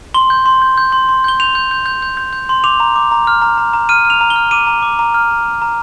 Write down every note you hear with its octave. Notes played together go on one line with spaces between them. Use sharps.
C6 G7
G6
C6
G6
G6
C6
C6
G6 G7
G6 F7
G6
G6
G6
G6
G6
G6
C6
D6 F7
A#5
D6
A#5
F6
A#5
A#5
A#5
F6 D#7
F6
F7
A#5
G7
F6
D6 D#7
A#5
D6
A#5
F6
A#5
A#5
A#5